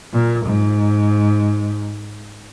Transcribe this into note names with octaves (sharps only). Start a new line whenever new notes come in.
A#2
G#2